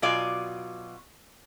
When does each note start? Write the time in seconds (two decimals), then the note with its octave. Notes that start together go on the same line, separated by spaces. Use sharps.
0.02 B2 F#3 F4 D5 G#5